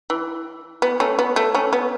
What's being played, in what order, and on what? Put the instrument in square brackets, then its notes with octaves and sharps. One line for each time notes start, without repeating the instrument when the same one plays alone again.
[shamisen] E3
B3
A3 C#4
B3
A3
A3 C#4
B3